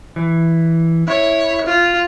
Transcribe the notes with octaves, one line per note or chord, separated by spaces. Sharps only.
E3
E4 C#5
F4